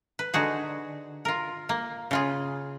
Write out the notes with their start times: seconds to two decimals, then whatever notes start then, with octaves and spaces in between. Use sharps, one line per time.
0.19 B4
0.34 D3 D#4 F#4 G#4
1.25 F4 A#4
1.69 A#3
2.11 C#3 F4 G#4